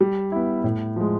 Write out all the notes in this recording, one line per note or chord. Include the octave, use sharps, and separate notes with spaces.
G3
B3 E4
A2
F3 G#3